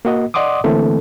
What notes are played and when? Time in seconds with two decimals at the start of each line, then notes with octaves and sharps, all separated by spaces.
0.05 A#3 F#4 D#5
0.34 D5 D#5 F#5 C6 D6 D#6
0.64 D3 E3 A3 A#3 C4 A4